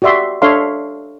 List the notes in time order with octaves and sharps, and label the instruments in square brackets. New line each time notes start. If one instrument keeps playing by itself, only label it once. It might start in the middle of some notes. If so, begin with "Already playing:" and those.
[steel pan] F#4 G4 D5 E5 C6
D4 A4 C#5 E5 F5 C6